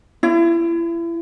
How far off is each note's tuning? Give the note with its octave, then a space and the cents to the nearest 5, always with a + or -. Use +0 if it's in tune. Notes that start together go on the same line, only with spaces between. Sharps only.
E4 +35